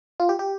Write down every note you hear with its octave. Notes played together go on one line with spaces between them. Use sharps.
F4
G4
G4